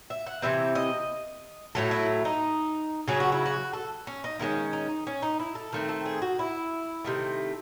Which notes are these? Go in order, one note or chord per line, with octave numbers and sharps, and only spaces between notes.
E5
F#5
C3 E3 C4 E5
D#5
A2 F#3 A3 A4
E4
D#4
C#3 F#3 C#4 G#4
F#4
E4
F#4
A4
C#4
D#4
D#3 G#3 C#4 E4
D#4
C#4
D#4
E4
A4
D#3 A3 C4
A4
G#4
F#4
E4
C3 D#3 A3